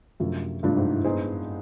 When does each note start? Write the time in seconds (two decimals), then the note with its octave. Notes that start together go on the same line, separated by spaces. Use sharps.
0.20 F#2 C3 F3 A3 D4 F4
0.63 G2 C3 F3 A3 D4 F4
0.77 G#2
0.91 A2
1.05 B3 D#4 G#4 C5